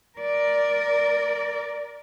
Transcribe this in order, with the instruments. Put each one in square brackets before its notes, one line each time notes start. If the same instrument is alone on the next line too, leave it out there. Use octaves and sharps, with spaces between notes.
[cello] A#4 D5